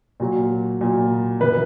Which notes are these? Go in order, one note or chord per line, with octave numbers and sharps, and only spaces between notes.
A#2 F#3
A#2 F#3
F#2 E3 B4